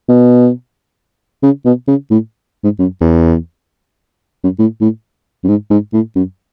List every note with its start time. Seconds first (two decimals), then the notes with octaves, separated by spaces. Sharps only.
0.09 B2
1.43 C#3
1.65 B2
1.88 C#3
2.11 A2
2.64 G#2
2.79 F#2
3.01 E2
4.44 F#2
4.59 A2
4.81 A2
5.44 F#2
5.48 G#2
5.71 G#2
5.93 A2
6.16 F#2